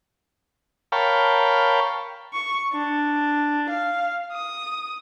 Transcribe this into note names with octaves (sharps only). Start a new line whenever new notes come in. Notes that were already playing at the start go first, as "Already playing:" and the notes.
A#4 C#5 F5 G5 A5 B5
C#6
D4
F5
D#6